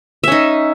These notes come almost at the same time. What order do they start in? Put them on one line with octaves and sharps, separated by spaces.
E5 C#4 D#4